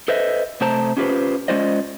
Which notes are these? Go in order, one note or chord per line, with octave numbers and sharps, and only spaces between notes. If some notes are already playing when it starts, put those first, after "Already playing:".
A4 B4 C5 D#5 E5
C3 A3 C5 A5 A#5
C#4 F4 G4 G#4 B4 C5
G#3 C#4 F4 C5 D5 D#5